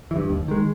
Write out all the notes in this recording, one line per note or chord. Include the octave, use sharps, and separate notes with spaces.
E3
G2
D#2
D#3 G#3